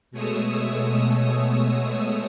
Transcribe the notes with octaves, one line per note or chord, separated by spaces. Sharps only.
B2 G#3 A3 C#5 D#6 E6